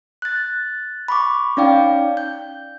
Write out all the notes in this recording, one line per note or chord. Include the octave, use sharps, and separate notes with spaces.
F#6 A6
B5 C#6 D6
C#4 D#4 D5 F5 G5
G6